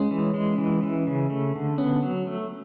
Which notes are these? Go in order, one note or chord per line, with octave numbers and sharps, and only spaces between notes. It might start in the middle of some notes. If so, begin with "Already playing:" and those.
Already playing: G#3 C#4
E3
G#3
E3
E3
C#3
A3
D3
B3 C#4
F#3
A3